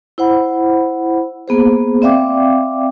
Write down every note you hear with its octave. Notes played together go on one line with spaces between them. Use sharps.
E4 C5 F#5 B5
A#3 B3 G#4 C5
C4 D5 E5 F5 G5 D6